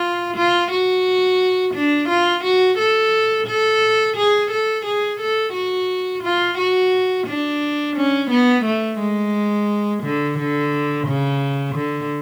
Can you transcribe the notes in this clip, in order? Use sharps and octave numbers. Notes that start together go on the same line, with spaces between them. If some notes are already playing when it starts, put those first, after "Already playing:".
Already playing: F4
F4
F#4
D4
F4
F#4
A4
A4
G#4
A4
G#4
A4
F#4
F4
F#4
D4
C#4
B3
A3
G#3
D3
D3
C#3
D3